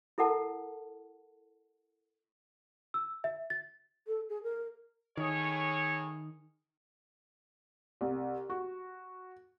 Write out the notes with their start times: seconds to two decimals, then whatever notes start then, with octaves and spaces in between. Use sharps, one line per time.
0.18 E4 A4 A#4 F#5 A5
2.94 E6
3.24 E5
3.50 A6
4.07 A4
4.29 G#4
4.43 A#4
5.17 A2 D#3 G#4 C#5
8.01 C2
8.50 F#4